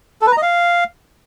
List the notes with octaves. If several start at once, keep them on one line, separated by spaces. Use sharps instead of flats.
A4
B4
A#5
D#5
F5